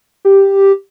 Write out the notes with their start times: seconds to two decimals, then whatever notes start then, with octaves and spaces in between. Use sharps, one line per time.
0.25 G4